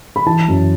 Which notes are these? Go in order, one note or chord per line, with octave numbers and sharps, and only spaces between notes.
B5
E3 A5
F#2